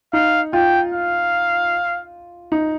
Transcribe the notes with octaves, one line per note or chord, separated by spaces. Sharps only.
D#4 F5
F4 G5
F5
D#4